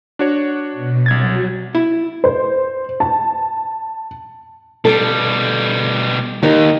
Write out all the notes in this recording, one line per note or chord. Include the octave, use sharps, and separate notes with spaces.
D4 F#4 C#5
B2
C2 F#3 G#6 A6
E4
C5
A5
B2 G3 A4
D#2 D#3 D#4 G4